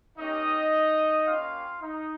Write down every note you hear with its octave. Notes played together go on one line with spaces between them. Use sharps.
A#3 C#4 D#4 G4 D#5
A#3 C#4 F4 G4 F5
D#4 D#5